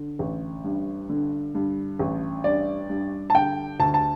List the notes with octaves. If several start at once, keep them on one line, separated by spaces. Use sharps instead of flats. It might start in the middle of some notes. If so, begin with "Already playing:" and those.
Already playing: D3
A1
G2
D3
G2
A1
G2 D5
G2
A5
D3 G5
D2 A5
A5